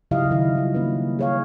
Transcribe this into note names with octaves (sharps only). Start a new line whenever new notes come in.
C#3 F#3 E4 G4 D#5 F5
D#3 E4
G3 D#4 F4
A#3 C#4 B4
G#4 C#5 F5